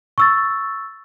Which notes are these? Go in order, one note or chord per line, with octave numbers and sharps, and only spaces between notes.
C#6 E6 A6